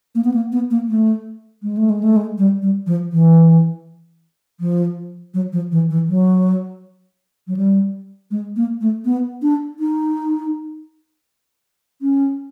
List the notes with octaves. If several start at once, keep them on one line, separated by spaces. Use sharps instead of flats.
A#3
B3
A#3
B3
A#3
A3
G#3
A3
G#3
A3
G#3
G3
G3
F3
E3
F3
F#3
F3
E3
E3
F#3
F#3
G3
G#3
A#3
A3
B3
D4
D#4
C#4